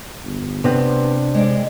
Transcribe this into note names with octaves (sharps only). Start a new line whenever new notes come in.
G1
C3 B3 C4 D4
G#3 D5